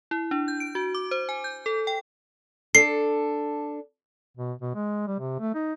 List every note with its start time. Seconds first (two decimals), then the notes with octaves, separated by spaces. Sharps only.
0.11 E4
0.31 D4
0.48 G6
0.60 D7
0.75 F#4
0.94 D6
1.11 C5
1.29 G#5
1.44 G6
1.66 A4
1.87 G5
2.75 D4 A4 C7
4.37 B2
4.62 B2
4.75 G#3
5.07 G3
5.20 C3
5.40 A3
5.54 D#4